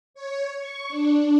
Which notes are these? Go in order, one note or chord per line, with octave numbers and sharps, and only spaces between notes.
C#5
C#6
D4